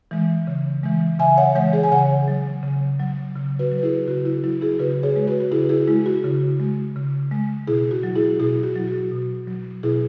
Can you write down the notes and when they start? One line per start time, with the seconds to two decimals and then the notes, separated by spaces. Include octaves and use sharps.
0.11 E3 G#3
0.47 C#3
0.83 E3 G#3
1.19 C#3 E5 G#5
1.37 C#5 F#5
1.55 E3 G#3 C#5 F#5
1.73 G#4 C#5
1.83 G#5
1.92 C#3 C#5 F#5
2.28 F#3
2.63 C#3
3.00 F#3
3.35 C#3
3.59 F#4 B4
3.72 F#3
3.78 B4
3.83 E4 G#4
4.07 C#3 F#4
4.25 E4
4.44 F#3 E4
4.61 E4 G#4
4.79 C#3 F#4 B4
5.03 G#4 C#5
5.16 G#3
5.27 F#4 B4
5.40 F#4
5.51 C#3 E4 G#4
5.69 E4 G#4
5.88 G#3 E4
6.06 F#4
6.24 C#3
6.60 G#3
6.96 C#3
7.31 G#3
7.68 B2 E4 G#4
7.91 F#4
8.03 F#3
8.15 E4 G#4
8.40 B2 E4 G#4
8.63 F#4
8.76 F#3
8.88 F#4
9.12 B2
9.47 F#3
9.83 B2 E4 G#4